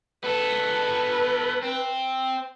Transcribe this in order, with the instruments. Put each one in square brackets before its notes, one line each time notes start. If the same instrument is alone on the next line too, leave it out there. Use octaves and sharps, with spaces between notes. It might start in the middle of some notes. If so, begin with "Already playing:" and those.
[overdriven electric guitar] B3 A4 [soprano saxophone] B4
[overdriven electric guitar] C4